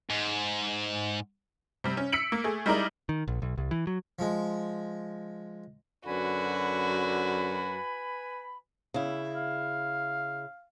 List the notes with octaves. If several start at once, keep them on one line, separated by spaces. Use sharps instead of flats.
G#2
C3 G3
C#4
E6 B6 C#7 D7 F#7
A#3
A3 G#4
G3 G#3 D#4 E4 A#4 D5
D#3
A#1
B1
C2
E3
F#3
F3 G#3
F#2 D3 F#4 B4 G#5 B5
C#3 E4
F5